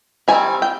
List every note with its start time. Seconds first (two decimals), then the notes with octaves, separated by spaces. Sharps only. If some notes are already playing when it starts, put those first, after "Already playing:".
0.28 D#3 G3 C4 G#5
0.62 G5